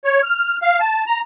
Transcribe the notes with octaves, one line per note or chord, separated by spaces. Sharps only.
C#5
F6
F5
A5
A#5